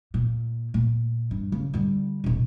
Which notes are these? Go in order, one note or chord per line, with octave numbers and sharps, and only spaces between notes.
A#2
A#2
G2
C#3
D3 G3
E1 A#1